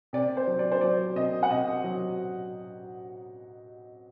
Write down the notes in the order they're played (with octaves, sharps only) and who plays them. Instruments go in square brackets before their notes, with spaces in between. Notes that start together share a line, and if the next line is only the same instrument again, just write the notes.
[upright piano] C3 D5
C5
F#3
D5
C5
F#3 D5
C3 D#5
F#5
C3 D#5
F#3